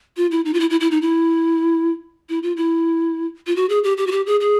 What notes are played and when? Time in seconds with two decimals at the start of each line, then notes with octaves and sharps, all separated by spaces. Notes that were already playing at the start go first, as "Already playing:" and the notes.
0.17 F4
0.31 E4
0.45 D#4
0.54 F4
0.60 E4
0.70 E4
0.80 E4
0.91 D#4
1.02 E4
2.29 E4
2.43 F4
2.57 E4
3.47 F4
3.56 F#4
3.69 G#4
3.84 G4
3.97 G4
4.07 F#4
4.12 G4
4.26 G#4
4.40 G#4